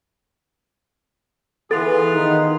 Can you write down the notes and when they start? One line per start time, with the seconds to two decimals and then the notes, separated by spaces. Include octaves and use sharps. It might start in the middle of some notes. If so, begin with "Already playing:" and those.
1.71 E3 B3 F4 G#4 A4 A6
2.13 D#3 D#4